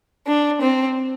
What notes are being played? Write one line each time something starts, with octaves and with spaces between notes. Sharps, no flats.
D4
C4